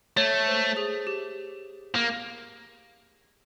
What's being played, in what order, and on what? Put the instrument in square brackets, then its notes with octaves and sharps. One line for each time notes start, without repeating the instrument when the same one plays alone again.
[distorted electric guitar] A3 [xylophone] C#5
[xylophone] C5
G#4
G4
[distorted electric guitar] A#3